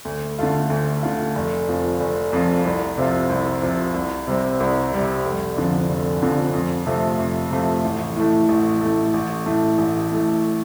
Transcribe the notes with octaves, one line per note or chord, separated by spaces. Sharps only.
D2
D3 A3 F4
D2
D3 A3 F4
F1
F2 F3
F1
F2 F3
C2
C3 F3 C4 F4
C2
C3 F3 C4 F4
C2
C3 G3 C4
C2
C3 G3 C4
F1
F2 D3 F3
F1
F2 D3 F3
F2
C3 F3 A3
F2
C3 F3 A3
A1
A2 A3
A1
A2 A3
A1
A2 A3
A1
A2 A3